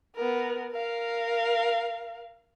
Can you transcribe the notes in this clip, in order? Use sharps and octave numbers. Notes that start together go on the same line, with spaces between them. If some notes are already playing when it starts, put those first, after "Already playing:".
B3 A#4
A#4 F5